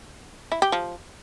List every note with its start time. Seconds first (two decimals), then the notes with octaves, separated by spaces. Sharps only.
0.52 E4
0.62 G4
0.72 F3